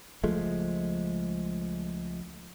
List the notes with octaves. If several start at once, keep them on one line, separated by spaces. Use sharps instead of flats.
C#2 F3 G#3 A3